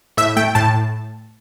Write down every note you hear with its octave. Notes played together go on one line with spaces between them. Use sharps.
A2 E5
A3 G5
A2 A5